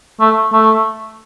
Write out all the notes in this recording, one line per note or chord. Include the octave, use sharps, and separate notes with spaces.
A3
A3